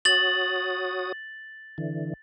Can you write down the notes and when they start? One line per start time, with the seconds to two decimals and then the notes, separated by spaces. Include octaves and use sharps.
0.05 F#4 C#5 D#6 A6 F#7
1.78 D3 E3